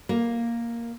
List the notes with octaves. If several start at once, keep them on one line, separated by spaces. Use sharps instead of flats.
A#3